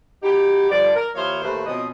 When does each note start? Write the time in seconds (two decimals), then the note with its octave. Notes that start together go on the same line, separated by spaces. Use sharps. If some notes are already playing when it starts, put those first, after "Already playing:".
0.23 D#4 E4 F#4 G4
0.70 G2 D3 F3 D4 D5
0.95 A#4
1.15 D#2 F3 E4 C5 C#5 F5
1.43 D#2 A2 A3 B4 C5
1.66 B2 F3 C4 C#4 D#5